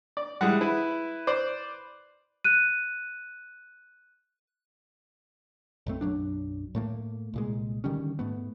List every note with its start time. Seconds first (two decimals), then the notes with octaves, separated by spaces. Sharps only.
0.17 D5
0.41 E3 G3 G#3 G#4 F#5
0.61 E4 B4
1.27 C5 D5
2.45 F#6 D#7
5.86 B1 F#2 A3 C4
6.01 B1 F#2 F#3 D4
6.75 A2 A3 A#3
7.34 C2 A#2 G#3
7.84 D3 D#3 G3 C#4
8.19 G#2 A3 B3